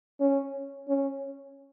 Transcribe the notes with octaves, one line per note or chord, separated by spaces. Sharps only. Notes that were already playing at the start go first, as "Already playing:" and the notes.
C#4
C#4